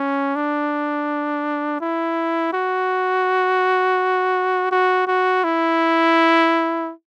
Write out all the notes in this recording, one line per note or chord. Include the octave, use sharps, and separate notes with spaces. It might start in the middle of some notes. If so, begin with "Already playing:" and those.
Already playing: C#4
D4
E4
F#4
F#4
F#4
E4